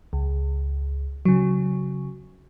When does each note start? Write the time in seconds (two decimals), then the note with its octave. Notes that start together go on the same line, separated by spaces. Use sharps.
0.13 C#2
1.25 C#3 F#3